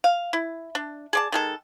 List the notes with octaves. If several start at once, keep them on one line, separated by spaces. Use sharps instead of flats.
F5
E4
D4
G#4 D5 A5
D#3 G#3 A4